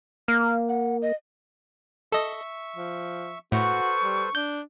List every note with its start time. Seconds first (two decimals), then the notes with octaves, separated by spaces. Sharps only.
0.28 A#3 F6
0.69 F#5
1.02 D#5
2.12 A4 D#5 E5 C#6
2.76 F3
3.52 A2 F#4 A4 B4 C5 C#6
4.03 G3
4.35 D4 G6